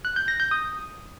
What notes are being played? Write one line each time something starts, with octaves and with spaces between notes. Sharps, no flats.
F#6
G6
A#6
G6
D#6